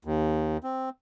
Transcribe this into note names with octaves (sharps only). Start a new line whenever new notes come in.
D#2
C4